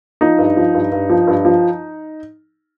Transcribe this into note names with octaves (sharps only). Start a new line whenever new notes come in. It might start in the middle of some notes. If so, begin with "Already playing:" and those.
F3 D#4
G2
F3
G2
G2
F3
G2
F3